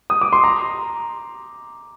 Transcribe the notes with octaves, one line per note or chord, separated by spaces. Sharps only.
D#6
D6
C6
A#5